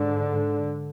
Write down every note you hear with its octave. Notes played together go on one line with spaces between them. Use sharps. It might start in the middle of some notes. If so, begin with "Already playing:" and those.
Already playing: G#2 D3